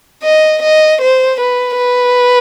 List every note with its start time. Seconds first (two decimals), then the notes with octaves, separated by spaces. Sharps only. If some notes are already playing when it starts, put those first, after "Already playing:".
0.24 D#5
0.62 D#5
1.02 C5
1.40 B4
1.78 B4